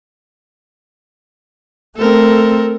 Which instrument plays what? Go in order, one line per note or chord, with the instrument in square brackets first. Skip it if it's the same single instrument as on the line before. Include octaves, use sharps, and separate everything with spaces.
[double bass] A3 C4 [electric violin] A4 A#4